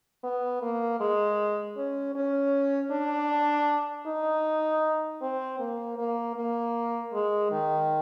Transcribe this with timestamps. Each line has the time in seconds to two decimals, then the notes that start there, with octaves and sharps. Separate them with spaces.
0.24 B3
0.62 A#3
1.00 G#3
1.77 C#4
2.15 C#4
2.91 D4
4.06 D#4
5.21 C4
5.59 A#3
5.98 A#3
6.36 A#3
7.13 G#3
7.51 D#3